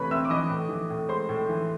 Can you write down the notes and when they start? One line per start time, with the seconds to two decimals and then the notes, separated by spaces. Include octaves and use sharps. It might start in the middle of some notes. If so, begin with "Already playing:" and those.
Already playing: C3 E3 A3 B4 C#5 B5 C#6
0.11 C4 E5 E6
0.25 D6
0.30 E3 D#5 D#6
0.50 A2
0.69 E3
0.90 A2
1.09 G#3 C5 C6
1.29 A2
1.49 E3